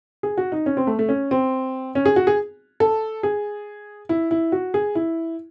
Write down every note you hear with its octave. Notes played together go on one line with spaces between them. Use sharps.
G#4
F#4
D#4
C#4
C4
A3
A3
C#4
C4
C#4
G#4
F#4
G#4
A4
G#4
E4
E4
F#4
G#4
E4